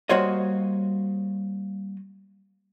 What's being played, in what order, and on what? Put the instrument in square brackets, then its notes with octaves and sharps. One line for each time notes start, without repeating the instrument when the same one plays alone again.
[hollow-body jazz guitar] G3 A#3 F#4 C5 C#5 D#5